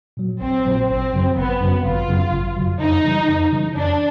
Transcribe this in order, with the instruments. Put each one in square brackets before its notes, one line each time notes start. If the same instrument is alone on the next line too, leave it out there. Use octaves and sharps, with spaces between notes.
[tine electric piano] A#2 F#3
[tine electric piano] A#1 [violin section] C4
[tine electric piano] A#2 F#3
[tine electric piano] G#1 [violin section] C4
[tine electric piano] F#2 C#3 F#3
[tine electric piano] G#1 [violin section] B3
[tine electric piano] F#2 C#3 F#3
[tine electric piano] G#1 [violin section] F4
[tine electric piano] F#2 C#3 F#3
G#1
F#2 C#3 F#3
[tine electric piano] F2 [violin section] D#4
[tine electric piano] C#3 E3 G3
F2
C#3 E3 G3
[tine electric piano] F2 [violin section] D4